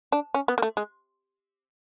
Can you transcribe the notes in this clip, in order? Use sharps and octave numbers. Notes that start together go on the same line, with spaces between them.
D4
C#4
B3
A#3
A3
G#3